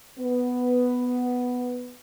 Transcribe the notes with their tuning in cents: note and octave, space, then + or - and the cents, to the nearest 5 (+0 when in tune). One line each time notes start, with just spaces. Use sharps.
B3 +5